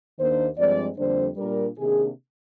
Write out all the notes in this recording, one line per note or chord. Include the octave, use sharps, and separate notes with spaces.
D#2 D#3 A#3 D4 C5
G2 F3 G#3 C4 D5
F2 D3 G3 A#3 D4 C5
A#2 G3 D4 A#4
C3 D#3 A#3 D4 G#4